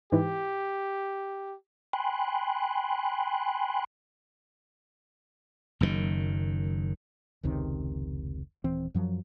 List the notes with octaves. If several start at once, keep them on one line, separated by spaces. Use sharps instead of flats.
G#2 E3 G4
G5 G#5 B5 C6 F#6
F#1 F#2 A#2 D#3
F1 C#2 C3 D#3
D#1 E3 C4
F#2 F3 F#3